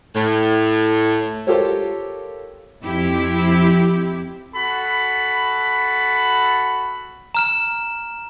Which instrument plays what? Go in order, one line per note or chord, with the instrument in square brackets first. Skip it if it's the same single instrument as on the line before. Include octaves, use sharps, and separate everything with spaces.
[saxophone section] A2
[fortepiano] F4 G4 A4 A#4 C5 C#5
[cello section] F2 C4 E4 G4
[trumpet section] F#4 A4 B5
[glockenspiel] A#5 F6 E7